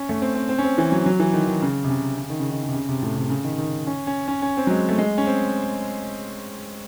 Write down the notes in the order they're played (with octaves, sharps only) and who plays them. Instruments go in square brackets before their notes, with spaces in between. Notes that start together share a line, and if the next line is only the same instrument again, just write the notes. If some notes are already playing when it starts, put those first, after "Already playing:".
Already playing: [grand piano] C#4
A3
C4
C4
C4
C#4
C4
E3
F#3
F#3
E3
D#3
D#3
C#3
C3
C#3
C#3
D#3
C#3
D#3
C#3
C3
C#3
C3
A2
C3
C#3
D#3
D#3
C#4
C#4
C#4
C#4
C4
F#3
G#3
A3
G#3
C#4
C4